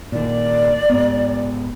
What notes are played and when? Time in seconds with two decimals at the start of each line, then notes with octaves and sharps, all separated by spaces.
0.12 A#2 D#3 D5
0.90 G#2 B3